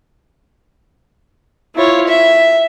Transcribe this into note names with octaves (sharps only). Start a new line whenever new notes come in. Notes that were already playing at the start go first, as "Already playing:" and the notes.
E4 F4 C#5
E5